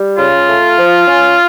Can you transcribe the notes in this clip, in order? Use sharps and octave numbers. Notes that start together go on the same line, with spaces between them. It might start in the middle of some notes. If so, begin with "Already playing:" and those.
Already playing: G3
C#3 F4
A3
F3
C#4